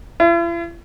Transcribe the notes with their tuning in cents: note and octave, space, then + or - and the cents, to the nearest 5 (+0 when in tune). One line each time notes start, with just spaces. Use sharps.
E4 +45